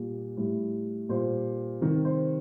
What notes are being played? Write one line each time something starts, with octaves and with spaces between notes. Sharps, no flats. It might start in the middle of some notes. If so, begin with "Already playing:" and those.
Already playing: A#2 G3
A2 G3
A#2 G3 C5
C3 D#3 G3 A#4
C5